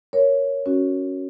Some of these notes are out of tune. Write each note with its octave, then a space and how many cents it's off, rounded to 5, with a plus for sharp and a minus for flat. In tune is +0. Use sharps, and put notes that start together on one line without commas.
A#4 +0 C#5 +0
C#4 +0 F#4 +0